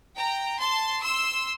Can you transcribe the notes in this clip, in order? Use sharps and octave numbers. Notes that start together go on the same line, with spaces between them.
G5 A#5
A5 C6
C6 E6